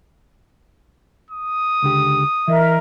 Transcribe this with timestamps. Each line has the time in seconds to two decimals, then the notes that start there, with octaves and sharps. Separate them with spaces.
1.30 D#6
1.82 C#2 D3 G4
2.48 E3 A#4 D#5 E5